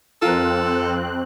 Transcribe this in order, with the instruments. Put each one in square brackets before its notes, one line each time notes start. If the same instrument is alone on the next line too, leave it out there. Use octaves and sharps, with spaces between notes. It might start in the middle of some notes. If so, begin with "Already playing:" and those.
[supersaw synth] F2 C4 F#6 [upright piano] F4 A#4 [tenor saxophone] A4